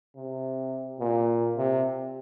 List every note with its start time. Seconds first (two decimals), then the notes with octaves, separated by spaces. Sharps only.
0.16 C3
1.00 A#2
1.57 C3